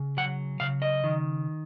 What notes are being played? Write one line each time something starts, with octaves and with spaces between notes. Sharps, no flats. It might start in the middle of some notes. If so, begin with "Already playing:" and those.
Already playing: C#3
F#3 F#5
C#3 F5
D#5
D#3